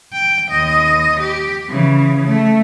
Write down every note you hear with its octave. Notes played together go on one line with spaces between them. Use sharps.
G5
D#2 D#5
G4
C#3 E3
A3